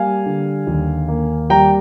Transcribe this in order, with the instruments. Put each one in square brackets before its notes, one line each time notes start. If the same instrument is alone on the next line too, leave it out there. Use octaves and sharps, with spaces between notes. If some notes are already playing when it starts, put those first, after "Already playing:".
Already playing: [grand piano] G3 A#3 F5 G#5
D3
D#2
A#3
G3 G5 A#5